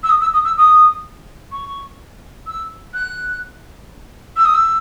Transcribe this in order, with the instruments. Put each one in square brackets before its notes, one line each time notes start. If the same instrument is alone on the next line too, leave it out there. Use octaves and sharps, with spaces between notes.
[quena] E6
D#6
E6
D#6
E6
D#6
C#6
E6
F#6
E6
D#6
E6